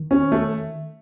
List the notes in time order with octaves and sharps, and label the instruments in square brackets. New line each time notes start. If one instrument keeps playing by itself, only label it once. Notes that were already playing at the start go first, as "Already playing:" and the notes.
Already playing: [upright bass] D#3
[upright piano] C#4
A3